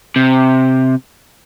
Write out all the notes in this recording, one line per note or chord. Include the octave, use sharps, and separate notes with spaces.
C3